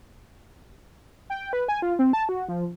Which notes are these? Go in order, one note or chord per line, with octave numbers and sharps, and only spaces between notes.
G5
B4
G#5
F4
C4
A5
F#4
F3